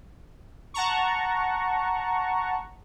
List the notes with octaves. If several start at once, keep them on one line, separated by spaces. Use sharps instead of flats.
F#5 A5 A#5 C#6